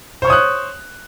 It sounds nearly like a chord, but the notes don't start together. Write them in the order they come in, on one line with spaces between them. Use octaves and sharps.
C5 C#6 C#5 D#6 F#6